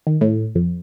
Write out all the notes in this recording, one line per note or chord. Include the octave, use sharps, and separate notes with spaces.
D#3
A2
F2